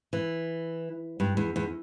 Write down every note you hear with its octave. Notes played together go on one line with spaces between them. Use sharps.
E3
G2
E2
E2